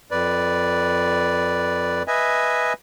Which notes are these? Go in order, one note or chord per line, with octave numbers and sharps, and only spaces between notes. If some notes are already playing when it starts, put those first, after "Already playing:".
F2 B4 D5
B4 D#5 E5 G#5